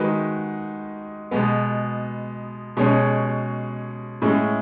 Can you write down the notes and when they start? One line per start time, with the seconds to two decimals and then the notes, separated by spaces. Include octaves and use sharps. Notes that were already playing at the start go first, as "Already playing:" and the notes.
Already playing: D#3 G#3 D#4 F#4 B4
1.31 B2 G#3 B3
2.77 B2 G#3 C#4 G#4 C#5
4.22 A2 G#3 C#4 G#4